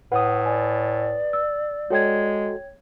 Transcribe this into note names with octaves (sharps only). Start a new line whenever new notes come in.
A2 B4 F#5 D#6
D5 G#5
E6
G#3 F#4 A4 C#5 G5 G#6